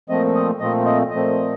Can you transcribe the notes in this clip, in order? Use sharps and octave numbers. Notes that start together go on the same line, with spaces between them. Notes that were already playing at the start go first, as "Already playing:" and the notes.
A#2 F3 A3 C4 D#5
D#5
A#2 F3 A3 C4 D#5
D#5
A#2 F3 A3 C4 D#5